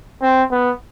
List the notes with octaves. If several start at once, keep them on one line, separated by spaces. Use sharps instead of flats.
C4
B3